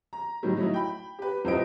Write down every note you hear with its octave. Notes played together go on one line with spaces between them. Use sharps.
A#5
A2 D#3 F#3 G3
F#3 A3 D#4 E4
G5 B5
G4 B4
D#1 C4 E4 B4 D#5 D7